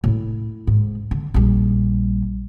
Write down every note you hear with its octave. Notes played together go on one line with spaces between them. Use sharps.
A2 E4
G#2
D3
A#1 G3